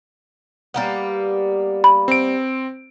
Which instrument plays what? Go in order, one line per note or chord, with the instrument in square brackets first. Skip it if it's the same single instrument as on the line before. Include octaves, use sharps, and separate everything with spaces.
[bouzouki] G3 A#3 B3
[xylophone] B5
[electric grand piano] C4 D7